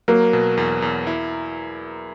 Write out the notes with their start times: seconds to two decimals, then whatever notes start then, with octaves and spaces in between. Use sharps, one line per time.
0.08 F#3 A#3
0.33 B2
0.57 E2
0.82 E2
1.07 E4